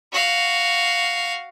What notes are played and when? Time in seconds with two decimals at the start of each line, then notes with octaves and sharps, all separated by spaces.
0.13 F#4 F5